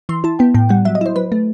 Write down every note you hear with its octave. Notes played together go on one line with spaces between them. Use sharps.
E3 C6
E4 A5
B3 G5
A2 G5
G3 F#5
F#3 E5
D#5
E4 C5
F#3 B4
A3